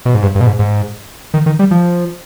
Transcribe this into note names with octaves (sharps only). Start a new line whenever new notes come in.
B2
G#2
G2
G2
B2
G#2
G#2
D#3
D#3
G3
F3